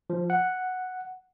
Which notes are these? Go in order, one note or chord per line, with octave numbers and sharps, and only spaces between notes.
F3
F#5